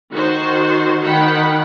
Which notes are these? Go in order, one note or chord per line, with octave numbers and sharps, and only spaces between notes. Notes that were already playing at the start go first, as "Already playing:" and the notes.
D#3 F#4 C5
D#3 F#5 G5 B5